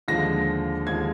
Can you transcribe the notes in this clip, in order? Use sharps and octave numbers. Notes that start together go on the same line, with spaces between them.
D#2 D3 F3 G#3 A#6
D#2 D3 F3 G#3 G#6